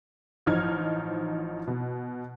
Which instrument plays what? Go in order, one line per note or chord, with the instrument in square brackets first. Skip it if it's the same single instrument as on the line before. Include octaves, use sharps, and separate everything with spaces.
[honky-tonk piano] A1 F3 D#4 F6 G#6
B2